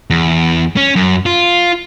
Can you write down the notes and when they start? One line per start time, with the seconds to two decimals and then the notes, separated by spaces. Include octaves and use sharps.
0.10 E2
0.77 C#4
0.96 F#2
1.26 F4